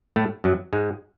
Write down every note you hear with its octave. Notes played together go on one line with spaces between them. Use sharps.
A2 A3
F#2 F#3
G#2 G#3